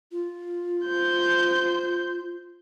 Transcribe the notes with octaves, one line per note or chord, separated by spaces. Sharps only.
F4
C5 G6